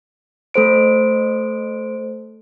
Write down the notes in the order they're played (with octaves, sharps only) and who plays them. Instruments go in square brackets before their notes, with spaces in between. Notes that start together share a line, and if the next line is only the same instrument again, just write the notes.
[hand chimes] A3 A4 C5 D7